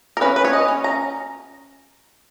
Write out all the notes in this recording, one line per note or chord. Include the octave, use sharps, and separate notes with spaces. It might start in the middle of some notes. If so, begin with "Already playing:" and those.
A#4
C#4 B4
B4
C#5
D#5
C#4
A#5